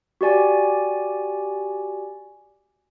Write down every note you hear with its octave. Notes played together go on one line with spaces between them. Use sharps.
F#4 G4 D5 G#5